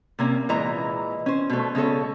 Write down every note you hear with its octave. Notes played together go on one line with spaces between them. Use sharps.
C3 A#3 C#4
A#2 E3 G#3 D#5 A#5
C#4 C5
B2 A3
C#3 G#3 B3 A4 C#5